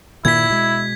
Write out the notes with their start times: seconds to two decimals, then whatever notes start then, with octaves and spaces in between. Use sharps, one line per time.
0.25 G2 A#2 D#3 E4 G#6 B6
0.50 B2 G#3